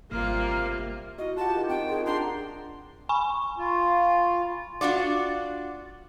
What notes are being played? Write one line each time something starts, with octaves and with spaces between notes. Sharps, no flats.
G#1 C3 G3 A#3 F4 F6
E4 F#4 D#5
F4 G4 F#5 A5
D#3
C4 G5
F4 G#4
D4 F#5 A#5 C6 G6
G#5 B5 C#6
F4
D4 F4 F#4 D5